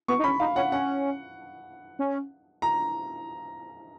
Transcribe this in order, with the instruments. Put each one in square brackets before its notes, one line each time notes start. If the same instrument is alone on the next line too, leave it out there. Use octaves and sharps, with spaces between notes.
[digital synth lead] B3 [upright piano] C#6
[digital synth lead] D#4
[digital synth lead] C#4 [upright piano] B5
[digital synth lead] D#4 [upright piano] F5
[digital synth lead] C#4 [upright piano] F#5
[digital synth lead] C#4 [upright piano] F#5
[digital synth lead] C#4
[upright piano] A#5